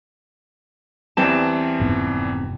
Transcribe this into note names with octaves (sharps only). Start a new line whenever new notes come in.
E2 E3 G3 C4 A5
F1 G#2 B3